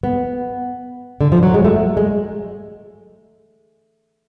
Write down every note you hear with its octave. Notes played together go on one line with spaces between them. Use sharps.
B3
D3
F3
F#3
G#3
A3
G#3